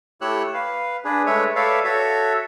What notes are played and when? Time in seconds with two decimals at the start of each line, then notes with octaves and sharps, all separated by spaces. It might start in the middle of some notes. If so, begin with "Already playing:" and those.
0.21 A3 E4 G4 C#5 E6 F#6
0.54 B4 F5
1.05 D4 G#4 B4
1.26 G#3 A3 B4 C#5 E5
1.56 A4 B4 C#5 D5 E5 F5
1.84 F#4 A4 C#5 E5